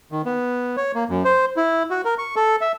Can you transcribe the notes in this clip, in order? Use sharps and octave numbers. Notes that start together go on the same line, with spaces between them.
D#3
B3
C#5
A#3
F#2
C5
E4
F#4
A#4
C#6
A4
E5